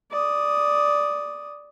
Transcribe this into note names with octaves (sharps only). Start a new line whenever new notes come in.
D5 D#6